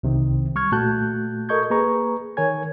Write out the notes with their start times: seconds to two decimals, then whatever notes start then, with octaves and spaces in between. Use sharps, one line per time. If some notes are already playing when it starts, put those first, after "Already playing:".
0.03 C2 C3 D#3 C4
0.55 G3 C#6 F6 G#6
0.72 A#2 A3 F#4 A5 F#6 G6
1.49 A4 A#4 D#5 C#6 G6 G#6
1.70 A#3 G#4 B4 A#5 C#6
2.37 D#3 A#4 C#5 G#5 G#6